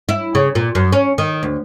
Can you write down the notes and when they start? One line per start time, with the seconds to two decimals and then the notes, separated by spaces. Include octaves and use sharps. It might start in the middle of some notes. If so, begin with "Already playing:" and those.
0.09 E4
0.35 C#3
0.55 A#2
0.75 F#2
0.92 C#4
1.18 D#3
1.43 D2